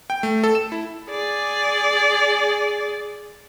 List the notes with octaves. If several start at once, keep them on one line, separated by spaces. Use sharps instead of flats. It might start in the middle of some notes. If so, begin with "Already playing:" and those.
G5
A3
A4
E7
E4
G#4 D5